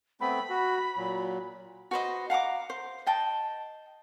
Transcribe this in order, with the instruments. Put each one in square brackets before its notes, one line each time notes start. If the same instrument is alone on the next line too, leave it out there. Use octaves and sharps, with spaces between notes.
[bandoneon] A3 B3 C4 [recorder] B5
[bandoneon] F#4
A#2 F#3
[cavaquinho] F#4 B4 C5 D#5
F5 F#5 A#5 D6
C5
D#5 G5 A5